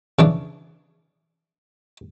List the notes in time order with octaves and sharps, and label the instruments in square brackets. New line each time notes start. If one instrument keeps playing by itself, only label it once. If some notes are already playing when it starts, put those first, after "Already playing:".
[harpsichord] C#3 E3 D4